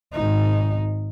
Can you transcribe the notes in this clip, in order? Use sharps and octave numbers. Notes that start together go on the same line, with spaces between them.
G#1 D#4